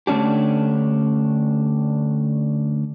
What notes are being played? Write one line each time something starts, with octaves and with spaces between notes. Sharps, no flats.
D3 A3 C#4 D4 G4